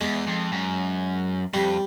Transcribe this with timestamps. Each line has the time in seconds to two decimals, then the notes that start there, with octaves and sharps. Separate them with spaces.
0.01 E2 G#3
0.27 F2
0.52 F#2
1.53 F2 G3